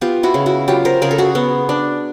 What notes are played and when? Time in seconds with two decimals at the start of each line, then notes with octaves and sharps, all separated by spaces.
0.01 B3 F4 G4
0.23 E4 F#4
0.34 C#3
0.46 E4 F#4
0.68 F#3 F4 G4
0.85 A#4 C5
1.02 C#3 G#4 A#4
1.11 A4
1.18 F#4 G#4
1.35 B3
1.69 D4